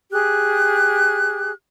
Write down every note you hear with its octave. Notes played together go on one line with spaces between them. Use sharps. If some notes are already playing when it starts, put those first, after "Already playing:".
G4 G#4 F#6